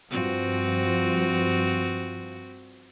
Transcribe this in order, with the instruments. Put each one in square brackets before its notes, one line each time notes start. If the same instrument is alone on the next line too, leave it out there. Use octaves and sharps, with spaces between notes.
[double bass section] G2 F3 [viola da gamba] C4 F#4